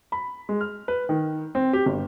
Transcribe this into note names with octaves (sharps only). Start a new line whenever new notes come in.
B5
G#3
F6
B4
D#3
C4
G4
G1